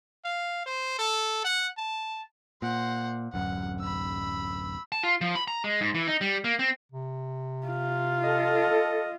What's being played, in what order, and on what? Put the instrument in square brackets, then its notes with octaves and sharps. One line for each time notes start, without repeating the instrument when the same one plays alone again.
[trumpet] F5
C5
A4
F#5
A5
[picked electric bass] A#2 [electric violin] C5 F#5
[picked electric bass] D1 F#2 [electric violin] F#5
[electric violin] B5 E6
[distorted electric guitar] A5
F4
F3
B5
A#5
G#3
G#2
E3
D#4
G3
A#3
C4
[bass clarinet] C3
[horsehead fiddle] F4
[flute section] A4 [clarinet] D#5